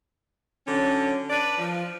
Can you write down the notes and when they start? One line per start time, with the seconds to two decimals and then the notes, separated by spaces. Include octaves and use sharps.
0.67 D3 F#3 C#4
1.30 D4 B4 D5
1.58 F3